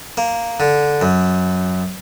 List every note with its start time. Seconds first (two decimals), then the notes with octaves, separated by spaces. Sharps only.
0.17 A#3
0.60 D3
1.02 F#2